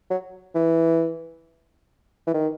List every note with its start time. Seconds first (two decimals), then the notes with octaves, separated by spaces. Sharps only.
0.10 F#3
0.55 E3
2.27 E3
2.34 D#3